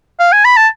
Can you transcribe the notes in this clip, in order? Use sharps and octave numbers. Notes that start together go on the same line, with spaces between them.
F5
G#5
B5
A5